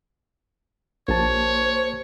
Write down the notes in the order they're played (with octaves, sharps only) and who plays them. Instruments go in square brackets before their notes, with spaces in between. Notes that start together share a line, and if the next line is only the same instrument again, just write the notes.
[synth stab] A#1 [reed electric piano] A#3 G4 A5 [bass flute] C5 [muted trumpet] C#5